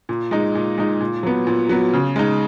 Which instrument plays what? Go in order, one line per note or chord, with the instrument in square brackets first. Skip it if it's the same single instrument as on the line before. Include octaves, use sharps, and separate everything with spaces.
[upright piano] A#2
G#3 D#4
A#2
G#3 D#4
A#2
F#3 B3
A#2
F#3 B3
C#3
G#3 D#4